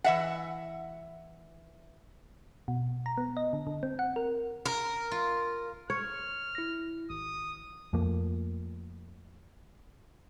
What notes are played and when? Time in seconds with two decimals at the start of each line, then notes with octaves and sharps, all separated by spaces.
0.04 E3 E5 F#5
2.68 B2
3.06 A#5
3.18 B3
3.37 D#5
3.53 D3
3.67 D3
3.83 C4
3.99 F#5
4.16 A#4
4.65 A#4
5.11 F4
5.90 C#5 F6
6.55 E4 A#6
7.10 G#1 D#6
7.93 F2 F3 A3 A#3